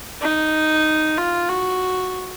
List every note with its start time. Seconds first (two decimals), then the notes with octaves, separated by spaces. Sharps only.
0.21 D#4
1.18 F4
1.49 F#4